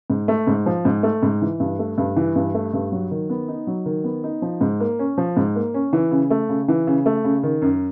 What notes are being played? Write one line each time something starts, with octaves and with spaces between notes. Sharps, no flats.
G#2
A3
G#2
F3
G#2
A3
G#2
E3
G2
A3
G2
E3
G2
A3
G2
F#3
D#3
B3
D#4
F#3
D#3
B3
D#4
F3
G#2
A#3
C#4
F3
G#2
A#3
C#4
E3
C#3
A3
C#3
E3
C#3
A3
C#3
D#3
F#2